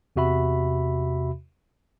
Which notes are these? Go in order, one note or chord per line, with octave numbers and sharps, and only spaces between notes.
E2 C3 F#4 E5 B5